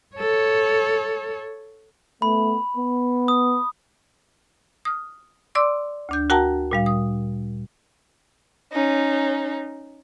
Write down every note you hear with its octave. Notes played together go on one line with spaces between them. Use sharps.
A4 C#5
A3 B3 B5
B3
D#6
D#6 F6
D5 C6 D6 E6
D2 D4 G6
F#4 A#4 F#5 G5 A5 A#5
A#2 G3 F5
D#6
C#4 D#4